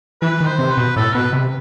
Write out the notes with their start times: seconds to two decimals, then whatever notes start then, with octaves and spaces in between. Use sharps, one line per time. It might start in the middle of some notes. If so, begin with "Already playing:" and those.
0.22 E3 B4
0.41 D#3
0.47 C5
0.59 C3
0.71 B4
0.77 B2
0.96 A2 A4
1.15 B2 B4
1.33 C3